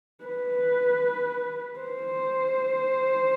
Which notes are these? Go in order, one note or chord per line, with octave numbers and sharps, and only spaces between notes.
B4
C5